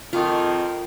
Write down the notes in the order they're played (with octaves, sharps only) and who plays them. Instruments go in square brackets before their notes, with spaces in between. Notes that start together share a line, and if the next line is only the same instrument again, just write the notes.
[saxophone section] F2 D#3 [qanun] F4